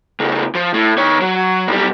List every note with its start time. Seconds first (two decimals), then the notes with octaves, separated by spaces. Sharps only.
0.20 A2 C#3
0.55 F3
0.74 A2
0.98 D#3 C#5
1.21 F#3
1.68 B1 G3